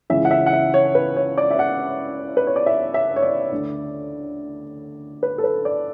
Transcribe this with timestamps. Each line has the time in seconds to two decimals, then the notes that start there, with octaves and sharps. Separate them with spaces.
0.10 C#2 C#3 E3 E5
0.25 F#5
0.31 E5
0.46 F#5
0.53 E5
0.74 C#5
0.95 B4
1.16 C#5
1.38 D5
1.51 E5
1.59 F#5
2.37 B4
2.47 C#5
2.56 D5
2.66 E5
2.94 E5
3.16 C#5
3.22 D5
3.52 D2 D3
5.23 B4
5.38 A4
5.44 B4
5.65 D5